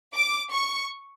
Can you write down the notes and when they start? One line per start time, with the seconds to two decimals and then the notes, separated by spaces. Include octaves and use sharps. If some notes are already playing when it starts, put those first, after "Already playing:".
0.15 D6
0.53 C#6